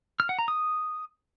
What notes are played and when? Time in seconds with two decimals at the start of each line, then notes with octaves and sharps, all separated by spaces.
0.20 F6
0.29 F#5
0.39 A#5
0.48 D#6